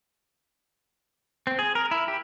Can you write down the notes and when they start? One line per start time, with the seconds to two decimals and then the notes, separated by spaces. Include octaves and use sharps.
1.47 C4
1.59 G#4
1.75 A#4
1.91 E4
2.08 G4